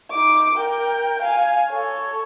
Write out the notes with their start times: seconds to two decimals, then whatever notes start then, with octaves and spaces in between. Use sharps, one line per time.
0.11 D#4 D6
0.55 A#4 G5
1.22 F5 G#5
1.70 A4 C#5